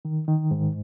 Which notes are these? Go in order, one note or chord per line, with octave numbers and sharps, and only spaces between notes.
D#3
D#3
G#2